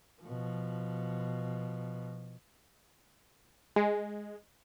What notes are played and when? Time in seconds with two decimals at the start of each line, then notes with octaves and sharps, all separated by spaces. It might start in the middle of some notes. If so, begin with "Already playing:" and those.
0.22 B2 F3
3.76 G#3